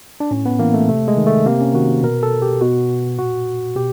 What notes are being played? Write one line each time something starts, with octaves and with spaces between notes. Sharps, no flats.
D4
A2 C#4
B3
E3 A#3
A3
C3 A3
G#3
D#3
A3
C3 A#3
C#4
D#3 F#4
B2 A#4
A4
G4
B2 F#4
A#2 F#4
B2 G4